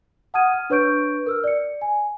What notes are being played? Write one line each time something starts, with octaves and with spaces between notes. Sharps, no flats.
F#5 A5 D#6 F6 G#6 D#7
F6
D4 B4 C#5 C#6 G6 D7
A#4 E6 F6
D5 C#7
G#5